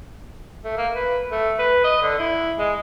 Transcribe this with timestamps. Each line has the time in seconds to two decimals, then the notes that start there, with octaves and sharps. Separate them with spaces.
0.65 A3
0.77 A#3
0.95 B4
1.32 A3
1.59 B4
1.84 D#5
2.02 D3
2.19 E4
2.58 G#3